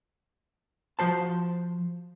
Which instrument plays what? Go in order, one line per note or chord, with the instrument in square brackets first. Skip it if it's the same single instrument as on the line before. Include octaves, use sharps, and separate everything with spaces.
[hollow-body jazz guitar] F3 F#4 C5 A5